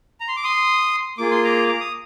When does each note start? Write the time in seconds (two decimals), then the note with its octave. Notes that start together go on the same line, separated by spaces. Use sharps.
0.20 A#5
0.28 C6
0.36 D6
0.44 C6 D#6
1.18 A#3 F4 G#4 D6
1.31 C6
1.44 A#5 D6
1.68 D6
1.80 D#6